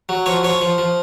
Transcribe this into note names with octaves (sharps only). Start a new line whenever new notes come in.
F#3
F3 C#5
F3 C#5
F3
F3